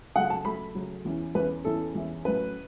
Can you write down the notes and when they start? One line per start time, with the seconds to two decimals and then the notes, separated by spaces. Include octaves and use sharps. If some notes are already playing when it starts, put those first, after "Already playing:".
0.15 C#3 F#3 A3 F#5
0.30 A5
0.45 C#3 F#3 A3 B5
0.75 C#3 F#3 A3
1.05 E2 E3 C#4 E4
1.35 E2 E3 C#4 E4 B4
1.65 E2 E3 C#4 E4 A4
1.95 E2 E3 C#4 E4
2.25 A2 F#3 A3 C#4 B4